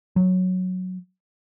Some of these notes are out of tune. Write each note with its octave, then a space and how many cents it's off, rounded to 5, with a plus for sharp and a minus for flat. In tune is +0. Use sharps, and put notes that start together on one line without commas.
F#3 -5